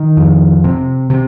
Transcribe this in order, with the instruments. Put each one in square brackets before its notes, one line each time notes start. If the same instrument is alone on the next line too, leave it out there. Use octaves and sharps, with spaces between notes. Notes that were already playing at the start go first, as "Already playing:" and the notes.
Already playing: [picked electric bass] D#3
F2
C3
C3